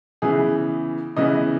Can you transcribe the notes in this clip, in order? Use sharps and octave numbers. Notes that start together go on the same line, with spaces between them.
C#3 E3 B3 G#4
C#3 E3 B3 D#5